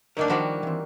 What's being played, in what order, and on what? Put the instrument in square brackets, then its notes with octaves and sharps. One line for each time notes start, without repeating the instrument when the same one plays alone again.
[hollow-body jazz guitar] D2 D#4 A#4 [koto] F#3 A#3 D4
[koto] D#3 G3 F#4 [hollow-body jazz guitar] F3 C5 F#5
[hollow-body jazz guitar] E3 C4